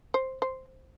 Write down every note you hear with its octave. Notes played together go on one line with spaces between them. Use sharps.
C5
C5